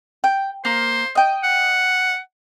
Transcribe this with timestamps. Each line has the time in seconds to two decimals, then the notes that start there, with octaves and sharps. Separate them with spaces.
0.24 G5
0.65 A#3 C5
1.15 D#5 G5
1.44 F#5